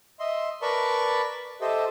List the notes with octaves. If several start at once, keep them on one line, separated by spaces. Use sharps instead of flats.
D#5 E5 C6
A#4 B4 D5 A5 B5 C#6
G4 A4 C5 D#5 E5